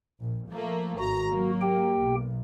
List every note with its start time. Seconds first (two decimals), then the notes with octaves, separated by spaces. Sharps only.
0.21 A#1
0.51 F3 A3 A#3
0.99 G#1 F#4 A#5
1.30 F#3 A#3
1.61 G4 G5
2.03 B1